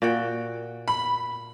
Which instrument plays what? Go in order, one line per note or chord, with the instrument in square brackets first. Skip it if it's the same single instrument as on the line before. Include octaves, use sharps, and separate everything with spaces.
[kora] A#2 F#4 G5
[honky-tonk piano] B5